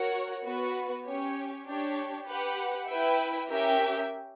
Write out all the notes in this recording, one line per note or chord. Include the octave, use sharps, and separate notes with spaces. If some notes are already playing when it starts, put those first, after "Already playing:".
Already playing: F#4 A#4 C#5 F#5
B3 F#4 B4
C#4 G4 C#5
D4 G4 C#5
G4 B4 F#5
E4 B4 E5 G5
C#4 G4 A#4 E5 G5